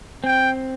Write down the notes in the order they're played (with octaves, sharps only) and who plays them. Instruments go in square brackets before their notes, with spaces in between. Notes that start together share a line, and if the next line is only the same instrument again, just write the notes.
[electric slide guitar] C4 [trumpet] G5